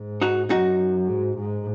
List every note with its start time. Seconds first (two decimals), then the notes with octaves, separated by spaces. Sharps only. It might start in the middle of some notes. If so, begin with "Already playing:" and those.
Already playing: G#2
0.21 D#4 F#4
0.50 F#2 D#4 F#4
1.08 G#2
1.38 G#2